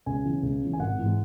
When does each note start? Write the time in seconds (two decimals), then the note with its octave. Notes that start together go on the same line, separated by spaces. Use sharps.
0.06 C#2 G#5
0.25 C#3 E3
0.43 C#2
0.61 C#3 E3
0.73 G#5
0.79 G#1 F#5
0.98 G#2 E3 G#3